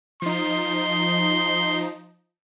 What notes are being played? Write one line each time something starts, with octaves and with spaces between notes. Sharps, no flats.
F3 D#4 C6